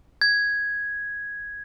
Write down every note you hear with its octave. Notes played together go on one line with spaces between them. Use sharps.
G#6